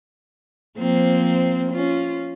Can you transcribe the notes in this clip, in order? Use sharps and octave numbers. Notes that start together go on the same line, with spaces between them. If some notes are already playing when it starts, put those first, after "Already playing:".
F3 A#3 C4
C#4 F4